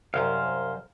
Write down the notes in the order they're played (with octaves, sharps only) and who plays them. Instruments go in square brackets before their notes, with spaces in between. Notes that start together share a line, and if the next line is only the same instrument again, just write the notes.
[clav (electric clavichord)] C2 F#2 [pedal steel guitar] C5 F5